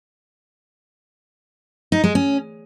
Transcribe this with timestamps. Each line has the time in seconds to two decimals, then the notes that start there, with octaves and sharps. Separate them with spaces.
1.92 D#4
2.04 G#3
2.15 C#4